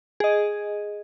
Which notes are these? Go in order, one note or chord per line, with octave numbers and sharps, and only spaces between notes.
G#4 D#5